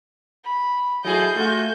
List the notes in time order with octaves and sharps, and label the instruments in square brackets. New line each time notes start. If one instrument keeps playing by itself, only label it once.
[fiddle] B5
[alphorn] F#3 [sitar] A3 E4 G#4 [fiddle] D#5 [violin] G6
[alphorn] A3 [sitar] F4 F#4 [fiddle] G#5